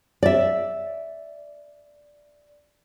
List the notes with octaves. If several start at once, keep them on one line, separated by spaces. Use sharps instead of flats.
D5 E5